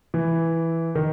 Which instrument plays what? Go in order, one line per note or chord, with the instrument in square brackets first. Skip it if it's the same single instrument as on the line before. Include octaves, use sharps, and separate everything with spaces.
[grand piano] E3
D#3